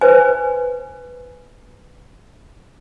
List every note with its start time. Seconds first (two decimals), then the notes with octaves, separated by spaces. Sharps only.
0.01 B4 C5 G#5